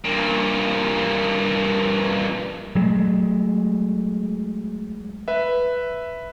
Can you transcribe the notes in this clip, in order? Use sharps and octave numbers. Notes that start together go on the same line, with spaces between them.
G2 A#2
F#3 G#3 A3
B4 E5